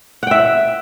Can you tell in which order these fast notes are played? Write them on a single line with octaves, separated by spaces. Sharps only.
F#5 G5 E5